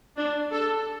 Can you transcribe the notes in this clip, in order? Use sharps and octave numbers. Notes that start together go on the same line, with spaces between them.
D4
A4